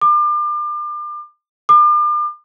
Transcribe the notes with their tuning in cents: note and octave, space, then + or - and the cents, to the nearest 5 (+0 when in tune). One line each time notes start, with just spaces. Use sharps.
D6 +35
D6 +40